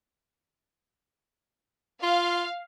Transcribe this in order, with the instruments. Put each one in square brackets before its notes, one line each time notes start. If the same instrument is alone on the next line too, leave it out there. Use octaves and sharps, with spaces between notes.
[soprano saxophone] F4 [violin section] F5